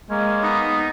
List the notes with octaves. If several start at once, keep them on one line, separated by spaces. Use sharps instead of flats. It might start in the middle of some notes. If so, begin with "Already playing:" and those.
G#3 A#3 C#4
B3 D#4